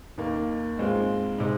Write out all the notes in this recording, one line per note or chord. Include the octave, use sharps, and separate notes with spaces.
D#2 D#3 A#3
G#2 G#3 C4 F4
C3 G#3 D#4